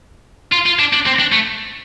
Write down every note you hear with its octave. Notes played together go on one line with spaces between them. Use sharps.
F4
F4
D4
D4
C4
D4
A3